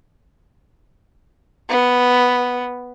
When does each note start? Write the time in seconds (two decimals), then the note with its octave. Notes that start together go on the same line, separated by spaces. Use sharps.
1.69 B3